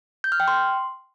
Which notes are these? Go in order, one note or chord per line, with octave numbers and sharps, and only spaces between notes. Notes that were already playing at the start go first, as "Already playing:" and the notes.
G6
F6
G5
C6